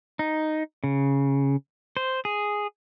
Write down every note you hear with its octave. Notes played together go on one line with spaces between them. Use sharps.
D#4
C#3
C5
G#4